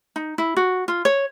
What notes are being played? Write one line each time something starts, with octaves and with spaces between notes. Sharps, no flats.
D#4
E4
F#4
F4
C#5